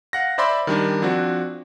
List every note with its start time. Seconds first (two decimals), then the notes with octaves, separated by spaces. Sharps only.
0.13 F5 F#5 A#6
0.38 C5 D5 E5 B5 C6 D6
0.67 D#3 G3 D4
1.02 F3 C4 D4 F#4